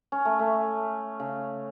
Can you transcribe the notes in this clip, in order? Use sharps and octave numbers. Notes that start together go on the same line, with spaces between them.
C#4
A3
A3
C#3